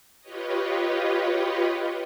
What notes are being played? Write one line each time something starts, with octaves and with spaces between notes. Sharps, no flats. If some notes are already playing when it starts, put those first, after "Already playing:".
F4 G4 B4 C#5 D#5